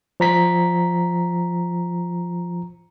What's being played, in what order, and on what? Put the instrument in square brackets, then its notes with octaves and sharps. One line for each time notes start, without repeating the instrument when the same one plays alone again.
[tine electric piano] F3 A#5 B6